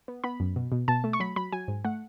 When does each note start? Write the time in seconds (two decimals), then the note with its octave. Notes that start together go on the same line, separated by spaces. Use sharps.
0.08 B3
0.24 B3 B5
0.40 F#2
0.56 B2
0.72 B2
0.88 B2 A5
1.04 A3
1.13 C#6
1.20 F#3 B5
1.36 F#3 B5
1.52 F#3 G#5
1.68 G#2
1.85 A3 F#5